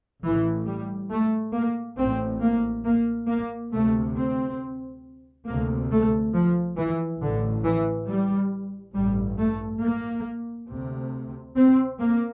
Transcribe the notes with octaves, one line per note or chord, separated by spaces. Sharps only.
A1 A2 E3
G3
A3
A#3
A1 A2 C4
A#3
A#3
A#3
D2 C3 A3
C4
D2 C3 A#3
A3
F3
E3
A1 A2 D3
E3
G3
A1 G2 G3
A3
A#3
D2 C3
C4
A#3